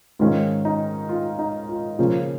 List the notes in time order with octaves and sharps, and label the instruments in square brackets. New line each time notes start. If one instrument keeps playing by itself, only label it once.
[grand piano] G#2 D#3 G#3 C#4 F4
D#4
F4
D#4
F4
C#3 F3 A#3 C#4 F4